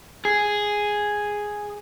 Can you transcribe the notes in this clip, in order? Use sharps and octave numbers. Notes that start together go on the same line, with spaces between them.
G#4